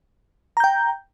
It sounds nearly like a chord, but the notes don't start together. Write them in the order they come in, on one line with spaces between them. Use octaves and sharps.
A#5 G6 G5